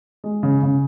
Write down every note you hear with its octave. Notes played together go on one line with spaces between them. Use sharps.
G#3
C#3
C#3